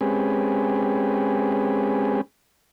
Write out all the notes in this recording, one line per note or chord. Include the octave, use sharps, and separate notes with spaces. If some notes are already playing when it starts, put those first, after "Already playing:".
G#3 C4 C#4 G4 G#4 B4